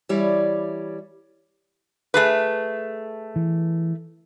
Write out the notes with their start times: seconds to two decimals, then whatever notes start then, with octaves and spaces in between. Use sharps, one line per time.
0.09 E3 G3 E4 C#5 D5
2.14 A3 G#4 B4
3.36 E3